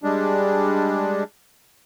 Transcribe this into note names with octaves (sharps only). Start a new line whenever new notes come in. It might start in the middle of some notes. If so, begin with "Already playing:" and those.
G3 G#3 D4